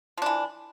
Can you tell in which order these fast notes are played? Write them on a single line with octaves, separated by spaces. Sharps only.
F3 D4 E3